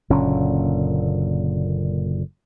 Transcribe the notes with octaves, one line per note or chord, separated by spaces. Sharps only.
F#1 A#2 D3 C#4